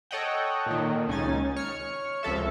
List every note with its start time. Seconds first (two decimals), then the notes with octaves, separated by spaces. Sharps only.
0.11 A4 C#5 D#5 F#5 G5
0.66 A#2 D#3
1.08 C#2 C#4 D#4 G#5 A6
1.56 C#5 F6 C#7
2.23 C#2 F3 A4 E5